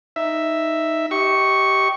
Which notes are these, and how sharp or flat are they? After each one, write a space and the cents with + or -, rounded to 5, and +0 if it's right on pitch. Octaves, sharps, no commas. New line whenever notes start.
D#4 +0 E5 +0
G4 -15 D#5 +30 C#6 +0